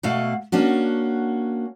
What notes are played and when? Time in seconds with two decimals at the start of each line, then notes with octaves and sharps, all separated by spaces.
0.03 B2 A3 F5 F#5
0.52 A#3 C#4 D4 F#4